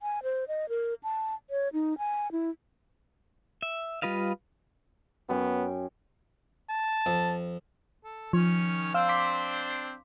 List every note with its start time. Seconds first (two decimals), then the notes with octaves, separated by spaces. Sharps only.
0.02 G#5
0.23 C5
0.48 D#5
0.69 A#4
1.03 A5
1.50 C#5
1.73 D#4
1.98 G#5
2.32 E4
3.62 E5
4.02 G3 F4 B4 D#5 F5
5.29 F#2 B3 G5 G#5
6.70 A5
7.06 F2
8.04 A4
8.33 D#3 F3 C#4 C#5
8.94 C4 D4 C5 F5 E6
9.09 C6 D6 B6